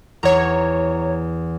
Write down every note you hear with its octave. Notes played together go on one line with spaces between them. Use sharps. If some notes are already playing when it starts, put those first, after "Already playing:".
E2 C#5 A#5